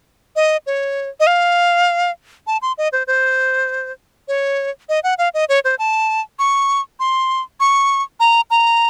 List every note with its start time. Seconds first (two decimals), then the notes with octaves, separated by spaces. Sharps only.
0.36 D#5
0.67 C#5
1.20 D#5
1.27 F5
2.47 A5
2.62 C6
2.78 D#5
2.93 C5
3.07 C5
4.28 C#5
4.89 D#5
5.04 F#5
5.18 F5
5.34 D#5
5.49 C#5
5.65 C5
5.79 A5
6.39 C#6
7.00 C6
7.60 C#6
8.20 A#5
8.51 A#5